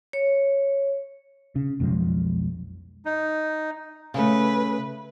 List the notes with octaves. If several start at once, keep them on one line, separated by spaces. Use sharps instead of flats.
C#5
C#3
B1 F2 F3 G#3
D#4
C#3 A3 B4